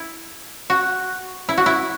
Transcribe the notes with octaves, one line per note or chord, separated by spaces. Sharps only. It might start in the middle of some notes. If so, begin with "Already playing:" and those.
Already playing: E4
F#4
E4
F#4
E4